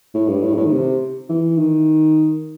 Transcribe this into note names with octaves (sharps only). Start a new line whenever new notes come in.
A2
G2
A2
G2
A2
D#3
C3
E3
D#3